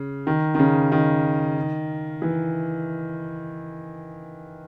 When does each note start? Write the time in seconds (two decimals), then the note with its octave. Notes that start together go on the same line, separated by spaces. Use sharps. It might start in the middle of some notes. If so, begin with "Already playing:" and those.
Already playing: C#3
0.27 D#3
0.55 D#3
0.59 C#3
0.92 D#3
2.22 E3